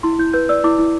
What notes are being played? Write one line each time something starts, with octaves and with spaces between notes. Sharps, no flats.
E4 C6
E4 G6
B4 G6
D5 E6
E4 D6
E4